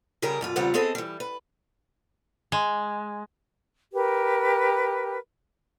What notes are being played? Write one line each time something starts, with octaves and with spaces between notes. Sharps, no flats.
C#3 G3 G4 G#4 A#4
F#2 B2 F4
E2 C#3 G3 C4 F4 F#5
B3 C4 G#4 A4 D#5
E3 G3
B4
G#3
G4 A#4 B4